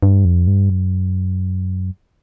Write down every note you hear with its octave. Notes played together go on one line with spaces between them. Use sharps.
G2
F2
G2
F#2